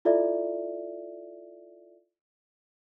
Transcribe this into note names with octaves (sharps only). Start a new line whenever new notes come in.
E4 F4 A4 D5 E5